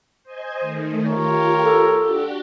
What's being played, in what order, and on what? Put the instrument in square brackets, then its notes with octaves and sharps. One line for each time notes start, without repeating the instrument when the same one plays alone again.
[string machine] C5 D#5 G#5
D#3 A3
[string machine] F4 G4 [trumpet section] A#4 C#5
[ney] A4
[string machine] D4 F#4 G4